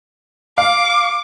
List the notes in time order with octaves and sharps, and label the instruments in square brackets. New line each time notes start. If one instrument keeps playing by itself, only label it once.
[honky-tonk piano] F5 [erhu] D6